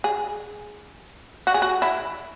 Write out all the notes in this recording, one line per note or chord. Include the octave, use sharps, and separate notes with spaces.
G#4
F#4
G#4
F#4
E4